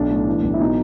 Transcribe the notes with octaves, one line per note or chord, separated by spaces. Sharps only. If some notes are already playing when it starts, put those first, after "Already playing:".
Already playing: B1 D4
A2
E3
B1
E4
B2 D#4